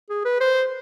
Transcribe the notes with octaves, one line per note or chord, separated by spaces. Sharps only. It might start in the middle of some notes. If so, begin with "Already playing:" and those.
G#4
B4
C5